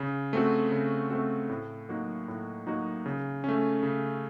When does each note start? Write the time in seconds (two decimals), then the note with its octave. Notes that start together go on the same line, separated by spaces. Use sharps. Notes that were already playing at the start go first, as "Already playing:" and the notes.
Already playing: C#3
0.33 A3 C4 F#4
0.72 C#3
1.10 A3 C4 F#4
1.49 A2
1.89 F#3 A#3 D#4 F#4
2.28 A2
2.67 F#3 A#3 D#4 F#4
3.06 C#3
3.44 A3 C#4
3.83 C#3